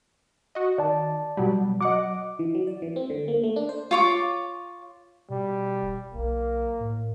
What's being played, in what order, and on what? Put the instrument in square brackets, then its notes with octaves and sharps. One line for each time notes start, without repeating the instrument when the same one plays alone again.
[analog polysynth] F#4 D#5
[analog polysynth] D#3 [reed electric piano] D5 A5
[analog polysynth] B2 F#3 G3
[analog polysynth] F#3 F#5 [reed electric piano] D#5 D6
[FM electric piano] E3
F#3
D5
E3
C4
D3
A#3
A3
D4
C5
[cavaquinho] F4 C#5 D6
[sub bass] B2 [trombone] G3
[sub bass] D#1
[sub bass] B1 [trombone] A#3
[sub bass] A2